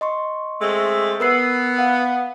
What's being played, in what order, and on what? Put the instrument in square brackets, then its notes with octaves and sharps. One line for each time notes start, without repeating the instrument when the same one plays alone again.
[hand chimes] D#5 C6 C#6
[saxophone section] G#3 A3 C4
[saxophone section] B3 [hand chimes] A#4 E6 C7
[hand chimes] F5 F#5